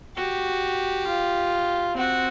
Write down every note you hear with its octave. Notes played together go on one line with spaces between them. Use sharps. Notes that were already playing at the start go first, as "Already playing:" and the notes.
F#4 G4
F4
C4 F#4